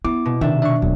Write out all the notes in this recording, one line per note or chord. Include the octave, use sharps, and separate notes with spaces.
B3 E4 D6
B2
C3 D#3 D4 E5
D4 E5 C#6
E1 D#2 B2 F#3